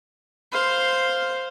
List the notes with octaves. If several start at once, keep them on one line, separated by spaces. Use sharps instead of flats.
C5 F5